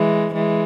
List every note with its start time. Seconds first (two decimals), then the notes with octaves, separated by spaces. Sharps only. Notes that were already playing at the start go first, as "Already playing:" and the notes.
Already playing: E3 G#3
0.34 E3 G#3